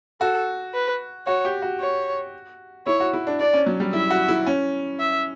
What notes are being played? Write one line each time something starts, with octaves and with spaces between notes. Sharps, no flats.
F#4 A4
B4
F#4 C#5
G4
F#4
C#5
E4 C#5
F#4
E4
D4
D4 D5
C#4
F#3
G3
E4 E5
F#4
E4
C#4
E5